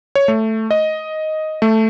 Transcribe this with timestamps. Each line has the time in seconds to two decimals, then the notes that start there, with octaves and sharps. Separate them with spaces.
0.15 C#5
0.28 A3
0.71 D#5
1.62 A3